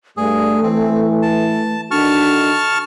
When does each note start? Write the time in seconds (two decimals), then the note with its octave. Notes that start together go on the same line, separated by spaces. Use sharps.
0.17 G2 G3 A3 G#4
0.63 E3 C4
1.22 A5
1.91 D#3 D4 F#4 A4 A5 C#6 F6